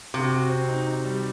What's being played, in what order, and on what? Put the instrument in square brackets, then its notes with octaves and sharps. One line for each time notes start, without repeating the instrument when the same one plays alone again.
[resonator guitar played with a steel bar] C3 [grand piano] F#4
[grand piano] F#4
C4
D#4
D#4
G3